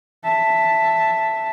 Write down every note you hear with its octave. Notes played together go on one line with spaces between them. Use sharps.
E5 A5